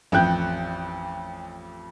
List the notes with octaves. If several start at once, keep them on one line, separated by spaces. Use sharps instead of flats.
A1 F2 G5 F#6 G6